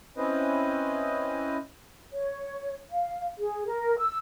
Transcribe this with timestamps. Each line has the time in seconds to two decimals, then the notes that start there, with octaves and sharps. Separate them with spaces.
0.17 C4 C#4 E4 B4 C5 D#5
2.12 C#5
2.91 F5
3.38 G#4
3.66 A#4
3.98 E6